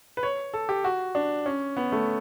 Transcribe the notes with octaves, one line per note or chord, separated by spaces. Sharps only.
B4
C#5
A4
G4
F#4
D4
C#4
B3
A3